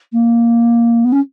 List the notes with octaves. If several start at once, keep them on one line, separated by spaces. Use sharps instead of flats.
A#3
B3
C#4